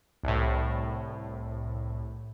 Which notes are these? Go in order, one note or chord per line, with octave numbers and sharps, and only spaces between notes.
C2 A2